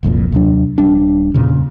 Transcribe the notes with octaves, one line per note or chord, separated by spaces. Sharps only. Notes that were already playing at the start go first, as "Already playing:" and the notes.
F#1 C2 F2 A#2
D#2 C3 F#3 D4
D#1 G3 D4
E2 A#2 C#3